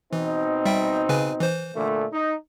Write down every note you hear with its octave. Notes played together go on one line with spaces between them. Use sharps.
B2 E3 C4 D#4
G3 E5 G5
C#3 B4 G#5
E3 C5
A#2 D3 A3
D#4